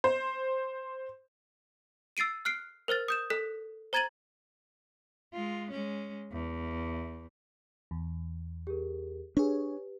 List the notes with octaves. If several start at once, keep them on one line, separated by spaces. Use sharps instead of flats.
C5
E6 A6 C7 D7 D#7
F6 F#6 C7 D7
A#4 C5 F6 A6
D#6 G6 E7
A4 F#6 B6
C5 A#5 G#6 A6 D#7 F#7
G#3 F4
G#3 C#4
E2
E2
G4 G#4 A#4
D4 G4 G#4 B4 C#5